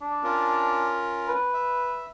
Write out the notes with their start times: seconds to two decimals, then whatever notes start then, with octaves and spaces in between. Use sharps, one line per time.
0.01 D4
0.23 C#4 F4 A#4
1.29 B4
1.54 E5